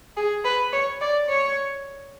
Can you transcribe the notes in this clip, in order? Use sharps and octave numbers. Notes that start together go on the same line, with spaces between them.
G#4
B4
C#5
D5
C#5